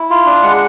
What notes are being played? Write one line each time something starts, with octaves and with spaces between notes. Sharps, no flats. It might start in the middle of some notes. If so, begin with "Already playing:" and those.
Already playing: E4
F4
D4
G#3 F#5